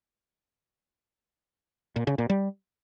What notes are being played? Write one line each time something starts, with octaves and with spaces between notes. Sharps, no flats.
A#2
C#3
A#2
G3